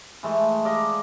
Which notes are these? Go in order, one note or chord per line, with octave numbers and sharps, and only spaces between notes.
E3 G#3 A3
D5 D#5 F5 A#5